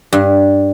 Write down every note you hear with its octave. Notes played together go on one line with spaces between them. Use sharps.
G2